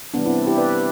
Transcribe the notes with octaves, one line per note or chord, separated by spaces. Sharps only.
C3 E3 G3 B3 D4
C4 E4
E4 G4
B4 D5